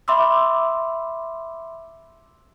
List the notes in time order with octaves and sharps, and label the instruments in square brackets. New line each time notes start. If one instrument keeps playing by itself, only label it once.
[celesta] E5 B5 C6 D6 E6